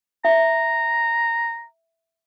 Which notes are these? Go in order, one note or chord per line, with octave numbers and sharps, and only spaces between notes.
E5 A#5